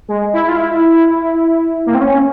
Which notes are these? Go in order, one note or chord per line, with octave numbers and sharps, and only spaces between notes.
G#3
E4
F4
E4
A#3
C4
C#4